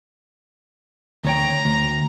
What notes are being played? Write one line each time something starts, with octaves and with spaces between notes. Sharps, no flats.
D2 C#5 G5 A#5
D2